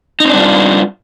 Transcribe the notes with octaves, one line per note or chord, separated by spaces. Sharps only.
G3 C4 D4 D#4 F4